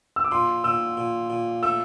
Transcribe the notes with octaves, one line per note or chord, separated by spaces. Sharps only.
E6
D6
A#2 C6
A#2 E6
A#2
A#2
A3 E6